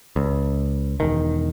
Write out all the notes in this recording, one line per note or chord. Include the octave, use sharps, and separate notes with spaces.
C#2
E1 D#3